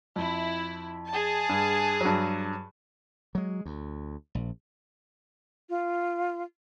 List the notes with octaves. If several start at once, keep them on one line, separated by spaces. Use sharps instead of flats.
F2 E4
G#4 A5
G2
G2 F#3
F#3 G#3
D2
A#1
F4